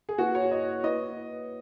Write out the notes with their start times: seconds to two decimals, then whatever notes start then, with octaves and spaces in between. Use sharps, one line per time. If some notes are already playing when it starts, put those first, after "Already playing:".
0.09 G#4
0.18 A#3 E4 F#4 B4
0.35 C#5
0.51 D#5
0.83 A#3 E4 B4 D#5